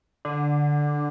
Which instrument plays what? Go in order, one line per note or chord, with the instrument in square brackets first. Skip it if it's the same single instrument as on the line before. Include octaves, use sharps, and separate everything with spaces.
[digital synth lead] D3